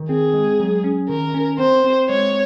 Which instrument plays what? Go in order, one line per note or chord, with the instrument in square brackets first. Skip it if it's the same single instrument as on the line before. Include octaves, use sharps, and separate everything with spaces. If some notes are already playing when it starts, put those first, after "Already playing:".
Already playing: [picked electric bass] D#3
[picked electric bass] C4 [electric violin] G#4
[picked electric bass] G#3
F#3
C#4
[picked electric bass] D#3 [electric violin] A#4
[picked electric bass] C#4
[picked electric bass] C4 [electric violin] C5
[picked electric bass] C4
[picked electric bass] G#3 [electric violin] C#5